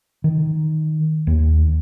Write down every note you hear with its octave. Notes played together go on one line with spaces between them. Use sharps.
D#3
D#2